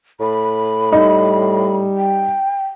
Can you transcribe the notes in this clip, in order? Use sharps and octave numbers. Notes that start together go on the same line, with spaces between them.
A2 B5
G3 D#4
G5